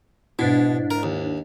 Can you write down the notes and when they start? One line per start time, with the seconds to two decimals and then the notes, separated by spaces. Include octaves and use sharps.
0.39 G#2 B2 D4 E4
0.91 A#4
1.03 D#2